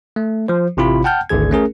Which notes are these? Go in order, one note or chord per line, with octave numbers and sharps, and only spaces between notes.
A3
F3 C5
A1 C3 E4 F4 B5
F#5 G5 A5 F6 G6
G#1 D2 D3 G#4 G#6
A3 C#4 G#4 A#4